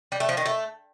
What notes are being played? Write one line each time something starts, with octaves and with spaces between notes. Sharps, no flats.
G3
A3
F3
D#3
A3